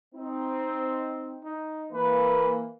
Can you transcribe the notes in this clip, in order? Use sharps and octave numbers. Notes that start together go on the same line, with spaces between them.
C4 D#4
D#4
E3 A#3 B4